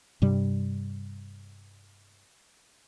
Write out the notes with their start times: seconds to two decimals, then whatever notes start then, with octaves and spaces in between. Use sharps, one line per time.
0.22 G2 C3 G3